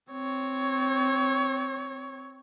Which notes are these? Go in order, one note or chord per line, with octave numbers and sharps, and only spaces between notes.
C4 C#5